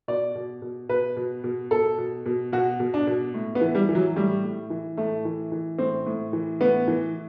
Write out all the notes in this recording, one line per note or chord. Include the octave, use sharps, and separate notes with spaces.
B2 D5
B2
B2
B2 B4
B2
B2
B2 A4
B2
B2
B2 F#4
B2
D4
B2
A2
B3
E3
G3
E3
F#3
A2 G3
A2
E3
A2 A3
E3
E3
A2 C4
A2
E3
A2 B3
E3